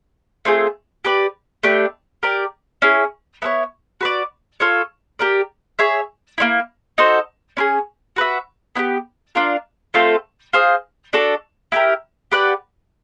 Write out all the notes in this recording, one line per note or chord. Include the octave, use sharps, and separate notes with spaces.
A3 C4 F4 G#4
G4 B4 D5
A3 D4 G4 B4
G4 A#4 D5
C#4 E4 G#4
B3 E4 A4 C#5
F#4 B4 D5
F4 A4 C#5
G4 A#4 D5
G#4 C#5 E5
A#3 C#4 E4
D#4 F#4 A4 C5
C#4 E4 G#4
F#4 B4 E5
B3 E4 G4
D4 F4 A#4
A3 C4 F4 A4
F4 G#4 C5 D#5
D4 F#4 A4 D5
E4 G4 A#4
G4 B4 D5 F#5